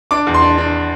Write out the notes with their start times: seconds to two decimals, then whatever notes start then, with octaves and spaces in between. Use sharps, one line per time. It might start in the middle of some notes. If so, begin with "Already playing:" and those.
0.11 D4 D6
0.27 E2
0.34 C6
0.42 D4
0.58 D4